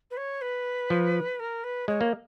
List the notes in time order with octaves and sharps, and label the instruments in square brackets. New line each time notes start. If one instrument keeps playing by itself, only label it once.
[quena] B4
C#5
B4
[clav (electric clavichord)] F3
[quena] A#4
B4
[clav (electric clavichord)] G#3 [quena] C#5
[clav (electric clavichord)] A#3